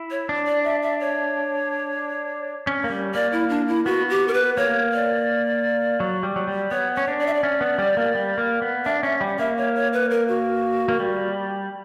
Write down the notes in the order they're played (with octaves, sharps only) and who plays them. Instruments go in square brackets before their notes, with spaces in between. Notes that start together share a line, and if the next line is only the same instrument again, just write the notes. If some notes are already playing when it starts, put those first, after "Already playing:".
Already playing: [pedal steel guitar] E4
[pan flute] C#5
[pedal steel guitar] D4
[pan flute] D5
E5
E5
C#5
[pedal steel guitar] C#4
A#3
G3
[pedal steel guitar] A#3 [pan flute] D5
[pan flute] E4
D4
E4
[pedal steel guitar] B3 [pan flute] F#4
[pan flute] G4
A#4
B4
[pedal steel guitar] A#3 [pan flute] C#5
[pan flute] D5
[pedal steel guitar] F#3
G3
F#3
G3
[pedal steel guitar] B3 [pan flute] C#5
[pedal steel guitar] C#4 [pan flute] C#5
[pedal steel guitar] D4
[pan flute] D5
E5
D5
[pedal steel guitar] C#4
B3
G3
A#3
G3
A#3
B3
[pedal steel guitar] D4 [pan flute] E5
[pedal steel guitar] C#4 [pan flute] E5
[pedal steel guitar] G3
[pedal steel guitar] A#3 [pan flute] E5
[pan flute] C#5
C#5
B4
A#4
F#4
[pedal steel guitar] A#3
G3